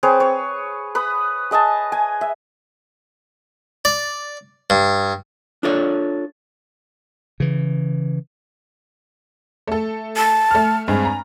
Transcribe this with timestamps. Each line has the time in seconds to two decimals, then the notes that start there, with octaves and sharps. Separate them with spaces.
0.03 C4 G#4 B4 C#5
0.20 C#5
0.95 B4 B5 D#6
1.51 G#4 D#5 G#5 A5
1.92 G#5
2.21 E5
3.85 D5
4.70 G2
5.63 D4 F4 A4 C#5
7.40 C#3 E3
9.67 A3 A4
10.17 A5
10.51 A3 F6
10.88 G2 G#3 C4 G#5
11.05 A#5